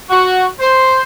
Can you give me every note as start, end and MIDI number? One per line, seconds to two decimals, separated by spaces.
0.10 0.46 66
0.59 1.03 72